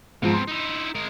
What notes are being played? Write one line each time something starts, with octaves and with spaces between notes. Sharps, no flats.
G#2 B2 F3 C4
C6
D#4 E4
G#3 A#4